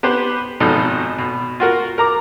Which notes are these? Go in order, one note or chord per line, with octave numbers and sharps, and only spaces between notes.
B3 G4 B4 C5
G#1 B2 F3 D#4 A4
B2
F4 F#4 A#4
A#4 A#5 D6